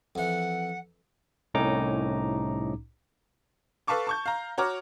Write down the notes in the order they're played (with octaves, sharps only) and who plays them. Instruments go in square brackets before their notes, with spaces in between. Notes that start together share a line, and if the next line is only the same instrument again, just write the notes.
[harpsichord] F2 E3 [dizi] F#5
[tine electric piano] C2 A2 C#4 D#4 A#5 D6
[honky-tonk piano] A4 B4 F5 A5 C#6 D6
A5 C#6 G6
F5 A#5
F#4 C#5 A#5 D6 F6